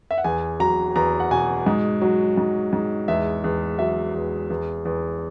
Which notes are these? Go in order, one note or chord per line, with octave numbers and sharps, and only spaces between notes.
E5
F#5
E2 G#5
F#3 A#5
E2 A#5
F#5
B2 G#5
G#2
F#3
G#2
G#2
E2 E5
E2
F#3 E5
E2
E2
E2